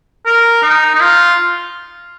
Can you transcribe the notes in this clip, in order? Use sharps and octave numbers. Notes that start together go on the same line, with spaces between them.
A#4
D#4
D#4
F4